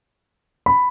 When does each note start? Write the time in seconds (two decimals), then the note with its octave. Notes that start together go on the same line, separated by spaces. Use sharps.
0.66 B5